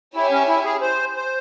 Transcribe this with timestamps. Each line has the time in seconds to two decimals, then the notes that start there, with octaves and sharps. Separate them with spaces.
0.15 E4 G4 C#5 E5 G#5
0.31 C#4
0.48 E4
0.65 G#4
0.81 C5
1.16 C5